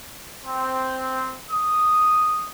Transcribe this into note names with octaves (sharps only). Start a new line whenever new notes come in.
C4
D#6